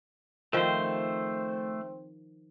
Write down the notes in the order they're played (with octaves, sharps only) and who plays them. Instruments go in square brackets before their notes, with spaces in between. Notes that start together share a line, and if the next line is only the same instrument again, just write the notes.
[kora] D#3 F3 G5 [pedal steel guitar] A3 C5 [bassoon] C4